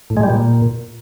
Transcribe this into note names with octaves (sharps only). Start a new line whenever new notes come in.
A2
G#3
G3
A#2